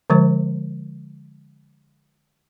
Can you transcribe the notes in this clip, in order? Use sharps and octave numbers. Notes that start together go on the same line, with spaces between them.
D3 F3 G#3 C5